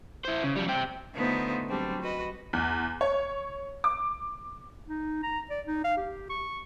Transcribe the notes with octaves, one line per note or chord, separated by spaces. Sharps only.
E4 C5
C#3
F3 G3
C4 G4
D3 A3 B3 D#4 F4 C5
F#3 G3 C4 D4
F#4 B4 D#5
E2
C#5
D6
D#4
A#5
D5
D#4
F5
G4
C#6